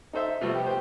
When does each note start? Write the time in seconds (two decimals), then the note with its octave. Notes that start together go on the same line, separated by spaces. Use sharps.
0.13 D#4 A4 C5 E5
0.41 C3 F3 G3 A3 B3
0.54 B3 G4
0.66 G4 C5